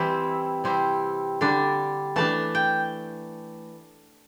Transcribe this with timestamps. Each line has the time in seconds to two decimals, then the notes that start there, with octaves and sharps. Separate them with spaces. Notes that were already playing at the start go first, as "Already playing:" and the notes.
Already playing: E3 G3 C4 E4
0.64 C3 G3 C4 E4
1.41 D3 G3 D4
2.16 E3 A3 D4 A5
2.55 G5